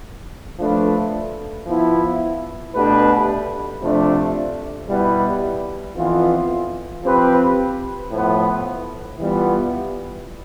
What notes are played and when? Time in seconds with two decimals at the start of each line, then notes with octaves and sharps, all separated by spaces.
0.58 F3 A3 D4 F4 B4
1.67 F3 B3 E4
2.74 B2 A3 D4 G4 B4
3.81 C3 F3 A3 D4
4.88 B2 G3 B3 E4 B4
5.96 F2 E3 B3 F4
7.03 F3 C4 G4 B4
8.10 A2 F3 B3
9.18 E3 G3 B3 F4